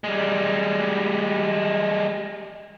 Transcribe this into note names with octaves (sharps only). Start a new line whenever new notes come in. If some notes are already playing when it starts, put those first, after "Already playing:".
G3 G#3